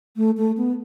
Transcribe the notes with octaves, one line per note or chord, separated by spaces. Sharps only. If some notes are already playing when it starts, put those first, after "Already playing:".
A3
A3
B3